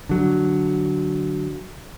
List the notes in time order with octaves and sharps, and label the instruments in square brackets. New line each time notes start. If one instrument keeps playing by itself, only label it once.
[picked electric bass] D3 F#3